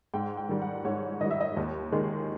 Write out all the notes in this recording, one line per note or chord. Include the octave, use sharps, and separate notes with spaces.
G#2 G5
G5
D#3 G3
F#5
G#2 C#5
D#3 G3 D#5
E5
D#5
D#2
D#3 G#3